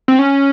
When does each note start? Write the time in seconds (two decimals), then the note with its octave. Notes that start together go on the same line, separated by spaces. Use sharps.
0.08 C4
0.19 C#4